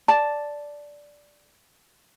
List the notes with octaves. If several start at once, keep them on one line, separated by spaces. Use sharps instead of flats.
D5 A5